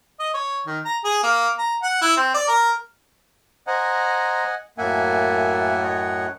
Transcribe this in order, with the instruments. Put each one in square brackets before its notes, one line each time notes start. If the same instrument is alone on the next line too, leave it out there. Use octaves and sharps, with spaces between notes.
[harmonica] D#5
C#5
D#3
A#5
G#4
A#3
A#5
F#5
E4
C4
D5
A#4
[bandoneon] C5 A#5 [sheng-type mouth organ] D#5 F#5 G#5
[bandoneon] F#2 A2 F#5 [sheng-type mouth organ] A#3 E5 G#5
[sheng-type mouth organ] C#5 D#5